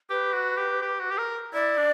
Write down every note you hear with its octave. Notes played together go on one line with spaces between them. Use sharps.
G4 B4
F#4
G4
G4
F#4
G4
A#4
E4 D5
D4